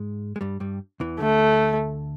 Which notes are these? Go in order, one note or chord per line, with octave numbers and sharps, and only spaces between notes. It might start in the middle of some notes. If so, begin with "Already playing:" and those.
Already playing: G#2 G#3
G#3
G2 G3
G2 G3
E2 E3
D2 D3 A3